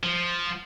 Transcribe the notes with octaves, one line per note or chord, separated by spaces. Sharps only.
F3